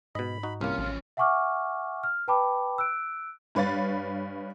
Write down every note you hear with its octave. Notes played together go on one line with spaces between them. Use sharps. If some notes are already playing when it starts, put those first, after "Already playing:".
G#2 B2 D#5 B5
D#4 F#4
C2 A#3 C#4 F4
A1 F3 C#4
E5 F#5 G#5 C#6 D6 F6
F6
B4 G5 A5 B5 D6
E6 F#6 D7
G2 B4 C#5 F5 A6